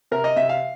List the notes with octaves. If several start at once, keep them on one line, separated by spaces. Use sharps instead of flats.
C3 A#4
D#5
C3 E5
F5